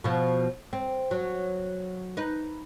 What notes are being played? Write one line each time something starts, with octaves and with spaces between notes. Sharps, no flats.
B2 F3
C4
F#3
D#4 B4